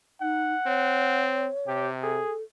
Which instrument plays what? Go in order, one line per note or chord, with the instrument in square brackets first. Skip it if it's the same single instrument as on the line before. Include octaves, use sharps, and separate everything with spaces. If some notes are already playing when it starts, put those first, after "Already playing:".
[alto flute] D#4 [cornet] F#5
[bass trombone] C4 [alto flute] C#5
[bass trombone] C3 [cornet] G4
[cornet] G#4 [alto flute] A4